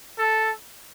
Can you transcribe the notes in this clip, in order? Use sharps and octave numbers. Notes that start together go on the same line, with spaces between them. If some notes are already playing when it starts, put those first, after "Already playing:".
A4